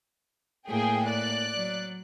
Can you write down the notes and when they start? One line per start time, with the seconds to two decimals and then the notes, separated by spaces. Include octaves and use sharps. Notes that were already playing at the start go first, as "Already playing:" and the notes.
0.68 A2 A#3 G#4 G5
1.08 D5 F#6
1.55 F#3